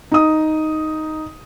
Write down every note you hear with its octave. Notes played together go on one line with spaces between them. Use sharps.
D#4 D#6